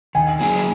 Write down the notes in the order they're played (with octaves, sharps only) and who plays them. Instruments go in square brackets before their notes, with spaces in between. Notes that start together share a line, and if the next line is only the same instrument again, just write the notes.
[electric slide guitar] D#3 [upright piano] G#5
[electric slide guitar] F#3 A#3 E4 G#4